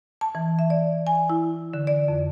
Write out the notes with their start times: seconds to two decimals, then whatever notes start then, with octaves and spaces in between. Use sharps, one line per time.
0.21 A5
0.35 E3
0.59 E5
0.70 D5
1.07 G#5
1.30 E4
1.73 D3
1.87 D5
2.08 F2